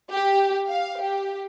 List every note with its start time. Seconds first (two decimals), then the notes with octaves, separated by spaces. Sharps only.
0.11 G4
0.69 F5
1.02 G4